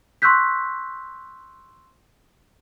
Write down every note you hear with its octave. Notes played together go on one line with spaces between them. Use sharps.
C6 C#6 E6 F#6 G6 B6